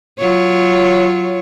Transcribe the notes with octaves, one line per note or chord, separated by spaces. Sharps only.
F#3 F4 C#5